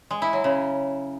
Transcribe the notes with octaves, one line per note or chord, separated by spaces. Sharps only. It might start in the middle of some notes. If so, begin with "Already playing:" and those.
G#3
E4
F#3
C#3